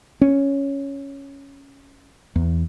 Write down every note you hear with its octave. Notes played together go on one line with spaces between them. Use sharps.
C#4
E2